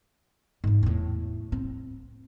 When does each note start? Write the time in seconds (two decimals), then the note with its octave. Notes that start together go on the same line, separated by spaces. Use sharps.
0.64 G#2 F3
0.83 E2 A2
1.52 C4